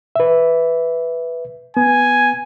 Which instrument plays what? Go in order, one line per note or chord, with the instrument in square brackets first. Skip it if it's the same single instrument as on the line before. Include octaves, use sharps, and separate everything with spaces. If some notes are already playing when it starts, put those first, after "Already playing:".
[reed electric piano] B4 E5
[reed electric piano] B3 [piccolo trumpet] G#5